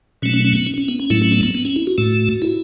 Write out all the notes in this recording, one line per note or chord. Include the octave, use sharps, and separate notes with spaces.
B2 F#3 A3 C#4
C#4
C#4
B3
C#4
C#4
B3
C#4
A2 F#3 A3 E4
C#4
B3
B3
B3
C#4
E4
F#4
A2 A3
E4